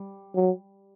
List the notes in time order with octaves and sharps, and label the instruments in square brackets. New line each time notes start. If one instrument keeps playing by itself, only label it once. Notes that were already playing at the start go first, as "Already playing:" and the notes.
Already playing: [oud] G3
[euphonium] F#3